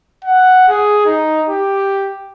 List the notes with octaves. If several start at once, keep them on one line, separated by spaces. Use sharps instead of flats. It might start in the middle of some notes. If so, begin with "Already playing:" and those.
F#5
G#4
D#4
G4